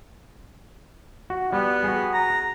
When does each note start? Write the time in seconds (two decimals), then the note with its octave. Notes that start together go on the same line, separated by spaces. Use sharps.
1.30 F#4
1.53 G3 B3
1.84 F#4 G#4
2.14 A#5